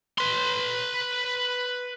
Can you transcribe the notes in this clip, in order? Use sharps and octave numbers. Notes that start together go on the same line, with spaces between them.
B4 C6